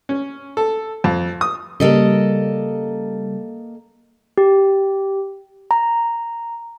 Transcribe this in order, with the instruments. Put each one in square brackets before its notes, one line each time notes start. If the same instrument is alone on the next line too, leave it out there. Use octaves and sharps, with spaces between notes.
[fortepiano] C#4
A4
F2
D#6
[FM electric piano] C#3 G3 [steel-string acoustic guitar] A#3 A4 D#5
[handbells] G4
A#5